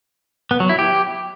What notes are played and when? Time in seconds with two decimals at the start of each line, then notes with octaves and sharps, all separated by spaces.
0.51 B3
0.60 F#3
0.69 E4
0.79 G4